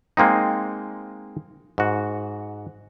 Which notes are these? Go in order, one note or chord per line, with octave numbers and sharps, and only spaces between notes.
G#3 A#3 C4 D#4
G#2 F#4